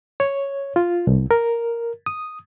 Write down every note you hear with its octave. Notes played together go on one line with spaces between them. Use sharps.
C#5
F4
C2
A#4
D#6